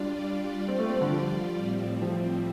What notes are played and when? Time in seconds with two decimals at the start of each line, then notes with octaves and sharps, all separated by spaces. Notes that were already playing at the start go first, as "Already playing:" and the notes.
Already playing: G3 D4 F4 D5
0.68 C4
0.79 A3
0.90 C4
1.01 D3
1.12 F3
1.57 A2 G3 C4
2.01 F3